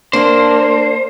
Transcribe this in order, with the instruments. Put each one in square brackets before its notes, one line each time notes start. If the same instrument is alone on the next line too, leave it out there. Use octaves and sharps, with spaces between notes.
[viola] A#3 [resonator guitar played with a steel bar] D4 A5 [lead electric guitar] C5